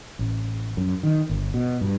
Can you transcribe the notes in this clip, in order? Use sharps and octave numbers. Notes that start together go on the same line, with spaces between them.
A1
F#2
D#3
G1
B2
G2